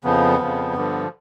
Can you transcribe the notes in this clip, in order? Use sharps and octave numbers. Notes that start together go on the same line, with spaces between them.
F2 C#3 F3 B3
F2 C#3 F3
G2 D3 F3